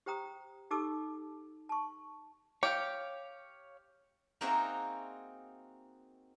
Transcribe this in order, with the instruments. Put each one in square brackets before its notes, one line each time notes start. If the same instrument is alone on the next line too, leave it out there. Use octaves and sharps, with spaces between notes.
[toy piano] G4 C5 G5 A#5 D#6
D#4 G4 A4 A5 D6 E6
A5 C#6
[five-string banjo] G4 [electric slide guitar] C#5 F5
[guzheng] A#3 C4 D#4 F#4 G#4 E5